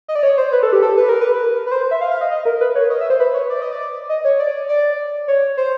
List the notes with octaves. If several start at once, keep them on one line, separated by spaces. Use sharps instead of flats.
D#5
D5
C#5
C5
B4
A4
G4
A4
B4
A#4
B4
B4
C5
E5
F5
F5
D#5
D#5
A#4
B4
C#5
D#5
E5
C5
B4
C#5
D5
D#5
D5
D#5
C#5
D5
D5
C#5
C5